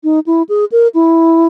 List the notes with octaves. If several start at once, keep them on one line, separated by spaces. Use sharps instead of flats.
D#4
E4
G#4
A#4
E4